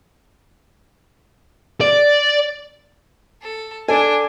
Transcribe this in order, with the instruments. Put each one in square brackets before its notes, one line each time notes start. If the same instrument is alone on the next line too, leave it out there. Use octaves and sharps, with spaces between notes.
[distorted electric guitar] D5
[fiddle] A4
[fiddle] D4 [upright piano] A4 [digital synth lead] G#5